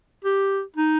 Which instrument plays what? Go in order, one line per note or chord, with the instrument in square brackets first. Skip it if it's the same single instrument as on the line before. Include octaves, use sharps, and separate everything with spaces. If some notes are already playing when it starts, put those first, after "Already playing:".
[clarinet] G4
D#4